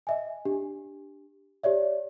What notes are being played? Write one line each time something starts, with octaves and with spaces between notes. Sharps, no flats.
D#5 E5 G#5
D4 G4
G4 C#5 D5 E5